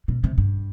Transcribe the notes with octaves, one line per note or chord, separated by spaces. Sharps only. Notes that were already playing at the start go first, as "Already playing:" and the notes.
B2
C3
G2